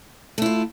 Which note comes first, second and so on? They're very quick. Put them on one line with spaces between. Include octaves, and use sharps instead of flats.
A3 E4 F4